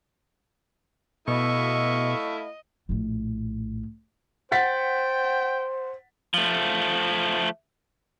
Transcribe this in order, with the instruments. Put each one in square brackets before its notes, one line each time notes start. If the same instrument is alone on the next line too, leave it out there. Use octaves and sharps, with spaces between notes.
[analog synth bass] B2 [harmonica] A3 E4 F5 [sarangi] D#5 [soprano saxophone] C#6
[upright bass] A#1 A2
[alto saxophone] C5 [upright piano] F#5 A6 B6 [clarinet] G5
[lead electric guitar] F3 A3